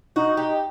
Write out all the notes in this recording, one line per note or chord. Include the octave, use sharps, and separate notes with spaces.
D#4 F#4
G4